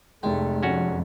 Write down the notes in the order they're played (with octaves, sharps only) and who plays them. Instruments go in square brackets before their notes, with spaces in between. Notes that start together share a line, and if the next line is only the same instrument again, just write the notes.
[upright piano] F1 G5 [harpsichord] G#3 [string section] A3
[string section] F2 [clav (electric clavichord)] C#4 F#4